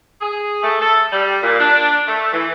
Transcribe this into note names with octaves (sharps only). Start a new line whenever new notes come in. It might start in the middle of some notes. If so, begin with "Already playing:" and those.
G#4
A3
A4
G3
A#2
D4
A3
E3